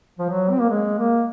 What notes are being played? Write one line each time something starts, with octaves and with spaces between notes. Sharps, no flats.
F3
F#3
C4
A#3
G#3
A#3